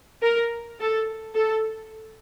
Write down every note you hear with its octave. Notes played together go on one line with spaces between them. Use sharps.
A#4
A4
A4